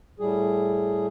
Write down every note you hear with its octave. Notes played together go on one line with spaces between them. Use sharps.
A2 G3 G#4